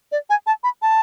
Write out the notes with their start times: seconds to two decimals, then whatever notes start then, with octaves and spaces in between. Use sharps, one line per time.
0.12 D5
0.30 G#5
0.47 A5
0.64 B5
0.82 A5